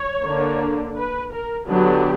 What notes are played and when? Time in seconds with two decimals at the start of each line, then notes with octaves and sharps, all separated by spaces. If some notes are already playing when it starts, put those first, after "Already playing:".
Already playing: C#5
0.26 D3 A#3 D4
0.96 B4
1.32 A#4
1.68 D3 F#3 B3 D4 G4